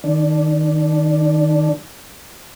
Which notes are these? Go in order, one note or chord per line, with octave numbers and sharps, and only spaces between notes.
D#3 D4